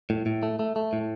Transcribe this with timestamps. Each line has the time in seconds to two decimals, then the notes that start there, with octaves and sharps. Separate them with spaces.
0.10 A2
0.26 A2
0.43 A3
0.59 A3
0.76 A3
0.93 A2